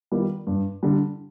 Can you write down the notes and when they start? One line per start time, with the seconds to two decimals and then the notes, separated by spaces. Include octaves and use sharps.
0.12 D#3 G3 B3 F4
0.47 G2
0.83 D3 G3